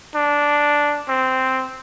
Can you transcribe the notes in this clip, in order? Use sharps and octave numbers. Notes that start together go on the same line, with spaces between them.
D4
C4